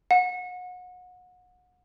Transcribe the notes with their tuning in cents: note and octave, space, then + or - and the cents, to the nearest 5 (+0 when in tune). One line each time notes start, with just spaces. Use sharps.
F#5 -30